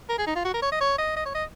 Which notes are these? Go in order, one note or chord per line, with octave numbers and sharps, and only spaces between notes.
A#4
G#4
D#4
F4
F#4
A#4
C#5
D#5
C#5
D#5
D#5
C#5
D#5